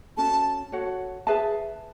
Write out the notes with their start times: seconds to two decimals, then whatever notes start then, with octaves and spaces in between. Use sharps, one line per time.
0.17 C#4 F#4 A4 A5
0.72 F#4 A4 C#5 F#5
1.27 G#4 B4 E5 A5